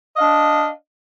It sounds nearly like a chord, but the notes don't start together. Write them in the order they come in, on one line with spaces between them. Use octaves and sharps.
D#5 F5 D4